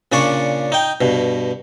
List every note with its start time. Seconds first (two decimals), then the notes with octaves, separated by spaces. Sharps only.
0.12 A#2 C#3 D4 D5 C#6
0.72 D#4 G5
1.01 G2 B2